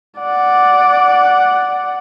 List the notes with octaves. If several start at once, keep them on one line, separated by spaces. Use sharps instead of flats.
D5 F#5